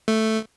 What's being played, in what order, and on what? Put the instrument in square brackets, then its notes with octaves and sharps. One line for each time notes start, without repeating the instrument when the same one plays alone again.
[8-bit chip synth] A3